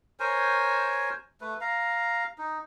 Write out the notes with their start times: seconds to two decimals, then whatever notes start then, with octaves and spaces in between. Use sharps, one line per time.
0.20 A#4 C5 C#5 G#5
1.41 A3 B4
1.61 F5 A#5
2.38 D#4